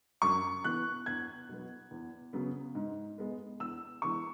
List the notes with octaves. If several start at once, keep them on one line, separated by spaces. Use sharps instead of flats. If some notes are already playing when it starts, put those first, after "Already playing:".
F#2 C#6
E3 B3 F#6
E2 G#6
B2 F#3 B3
E2
C#3 F#3 B3
G#2
G#3 B3
E2 E6
E3 G#3 B3 C#6